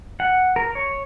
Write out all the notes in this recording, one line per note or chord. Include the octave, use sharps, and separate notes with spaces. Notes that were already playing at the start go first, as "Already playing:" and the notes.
F#5
A#4
C#5